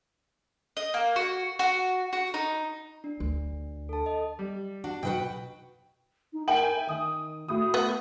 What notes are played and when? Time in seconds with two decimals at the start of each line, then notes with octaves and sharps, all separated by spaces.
0.77 D#5
0.94 A#3
1.16 F#4
1.59 F#4
2.13 F#4
2.34 D#4
3.04 D4
3.20 D2
3.89 A4 A5
4.06 D#5
4.39 G3
4.84 D4 F#4
5.03 B1 F#4 B4 F#5 G5
6.33 D#4
6.48 A#4 G5 G#5 F#7
6.76 E5
6.89 D#3 D#6
7.49 A2 F#4 D#6
7.74 B3